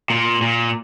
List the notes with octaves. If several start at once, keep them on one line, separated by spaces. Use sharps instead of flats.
A#2
A#2